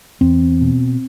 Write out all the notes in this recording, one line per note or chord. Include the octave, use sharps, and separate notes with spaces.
E2 C4
B2